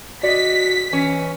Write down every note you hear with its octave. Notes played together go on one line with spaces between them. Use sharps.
F#4 D5 D#5 B6
E3 C#4